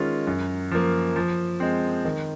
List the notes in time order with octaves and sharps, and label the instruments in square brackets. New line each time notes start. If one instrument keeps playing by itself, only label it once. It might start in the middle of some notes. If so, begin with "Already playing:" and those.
Already playing: [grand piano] D#3 G#3 C#4 F4
F#2
F3 A#3
F3
G#3 C4
D#3